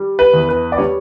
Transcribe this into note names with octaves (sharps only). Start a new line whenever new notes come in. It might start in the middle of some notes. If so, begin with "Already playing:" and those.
Already playing: G3
B4
E2
B4
D5
G3 C#5